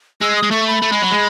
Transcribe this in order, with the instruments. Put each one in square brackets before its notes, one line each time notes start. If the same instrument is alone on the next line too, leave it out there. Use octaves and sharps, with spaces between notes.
[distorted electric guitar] G#3 [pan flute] E6
[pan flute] D#6
[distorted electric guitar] G#3
[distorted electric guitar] A3 [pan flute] C#6
[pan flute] B5
[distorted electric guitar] A3
G#3
F#3
G#3